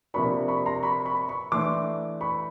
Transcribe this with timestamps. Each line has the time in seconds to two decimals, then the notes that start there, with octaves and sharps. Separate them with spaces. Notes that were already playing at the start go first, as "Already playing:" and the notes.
0.14 C3 F3 A#3 D4 B5 C#6
0.48 B5 C#6
0.66 A#5 C6
0.82 B5 C#6
1.05 B5 C#6
1.29 B5 C#6
1.52 E3 A3 D4 C6 D6
2.21 B5 C#6